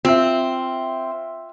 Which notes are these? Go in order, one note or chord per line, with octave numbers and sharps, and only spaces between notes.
C4 F4 E5